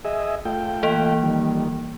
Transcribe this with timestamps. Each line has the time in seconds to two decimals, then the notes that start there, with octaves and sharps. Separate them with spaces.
0.05 G#4 D#5 E5
0.45 A3 F4 G5
0.83 E3 A#3
1.23 D#3 G3